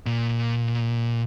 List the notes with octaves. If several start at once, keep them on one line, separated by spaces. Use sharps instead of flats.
A#2